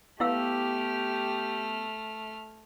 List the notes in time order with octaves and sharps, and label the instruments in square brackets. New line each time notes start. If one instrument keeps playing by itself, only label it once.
[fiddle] A3 F6 [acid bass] B3 [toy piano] E4 F5 E6 [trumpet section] G4